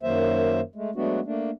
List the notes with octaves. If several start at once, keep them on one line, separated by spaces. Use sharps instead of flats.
F#2 D#3 F#3 A#3 C5 E5
G#3 A3
F#3 G#3 A3 B3 D4 F#4
A3 A#3 D4